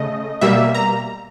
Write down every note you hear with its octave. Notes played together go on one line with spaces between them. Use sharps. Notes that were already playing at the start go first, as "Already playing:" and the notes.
Already playing: C#3 A3 D#5
B2 G3 A#3 E5
A#5